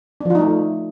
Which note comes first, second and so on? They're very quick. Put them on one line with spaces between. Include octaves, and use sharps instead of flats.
D4 F3 F4 D#4 A3